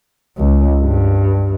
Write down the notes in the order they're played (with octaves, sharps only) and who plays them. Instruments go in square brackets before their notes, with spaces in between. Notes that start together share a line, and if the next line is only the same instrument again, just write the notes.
[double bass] C#2
G2